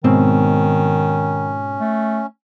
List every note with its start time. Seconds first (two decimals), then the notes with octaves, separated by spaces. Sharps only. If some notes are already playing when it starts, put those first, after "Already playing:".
0.04 G#2 B2 D#3 C4 C#4
1.79 A3